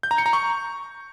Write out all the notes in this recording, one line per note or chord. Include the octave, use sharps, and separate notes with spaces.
G6
A#5
C#7
A#5
C#6